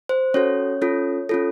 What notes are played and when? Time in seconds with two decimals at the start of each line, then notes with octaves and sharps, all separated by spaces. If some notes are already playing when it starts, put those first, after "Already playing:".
0.09 C5
0.34 C#4 F#4 A4 C#5
0.82 C#4 F4 A4
1.29 C#4 F4 A4